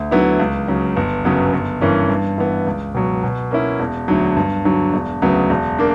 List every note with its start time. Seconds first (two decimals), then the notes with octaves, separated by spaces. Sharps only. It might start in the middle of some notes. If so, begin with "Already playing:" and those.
Already playing: D2
0.11 D3 F#3 B3 E4
0.40 C#2
0.68 C#3 F#3
0.96 G1
1.25 F#2 C#3 F#3 B3
1.53 G1
1.81 G2 E3 A#3 C#4
2.10 G2
2.38 E3 B3
2.67 C#2
2.95 B2 F#3
3.24 B2
3.51 A#3 C#4 E4
3.80 E1
4.08 D2 D3 F#3
4.36 G2
4.65 D3 F#3
4.94 E1
5.22 D2 C#3 F#3 B3
5.50 E1
5.78 A#3 D4